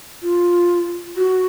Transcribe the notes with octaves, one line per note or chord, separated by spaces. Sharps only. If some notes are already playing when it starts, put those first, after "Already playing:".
F4
F#4